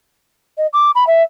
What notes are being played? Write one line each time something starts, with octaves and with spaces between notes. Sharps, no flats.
D#5
D6
B5
E5